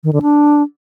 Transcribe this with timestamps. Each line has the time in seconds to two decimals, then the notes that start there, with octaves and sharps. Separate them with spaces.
0.04 D#3
0.13 D3
0.22 D4